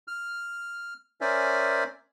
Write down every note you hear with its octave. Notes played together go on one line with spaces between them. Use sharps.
F6
C#4 A#4 C5 D5 E5 G#5